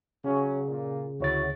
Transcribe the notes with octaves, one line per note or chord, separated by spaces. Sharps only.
C#3 F#3 C#4
A#2
D2 F#3 E4 F#4 C#5 A6